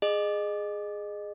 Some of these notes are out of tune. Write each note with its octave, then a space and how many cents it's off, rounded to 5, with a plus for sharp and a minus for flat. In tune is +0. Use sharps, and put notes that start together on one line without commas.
G#4 +0 D#5 -30